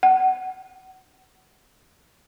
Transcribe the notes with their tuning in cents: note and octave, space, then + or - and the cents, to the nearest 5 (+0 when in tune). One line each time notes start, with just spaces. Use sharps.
F#5 +20